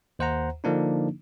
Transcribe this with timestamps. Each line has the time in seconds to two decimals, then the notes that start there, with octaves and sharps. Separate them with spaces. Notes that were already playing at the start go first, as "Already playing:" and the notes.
0.19 D#2 C5 F#5 A#5
0.64 D3 F3 A#3 D4 D#4